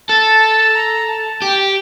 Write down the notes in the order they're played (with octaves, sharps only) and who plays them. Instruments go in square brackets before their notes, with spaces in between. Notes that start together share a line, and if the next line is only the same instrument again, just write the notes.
[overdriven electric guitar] A4 [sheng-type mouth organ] A5
[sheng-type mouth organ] A#5
A5
[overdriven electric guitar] G4 [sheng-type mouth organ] G5